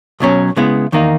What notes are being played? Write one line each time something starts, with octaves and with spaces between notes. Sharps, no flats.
B1 B2 F#3 C#4
C#3 G#3 B3 E4
E2 D#3 A#3 D#4